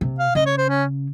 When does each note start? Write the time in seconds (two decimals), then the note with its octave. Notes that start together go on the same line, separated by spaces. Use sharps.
0.01 C3
0.19 F5
0.35 C#3 D#5
0.46 C#5
0.58 C5
0.69 C#4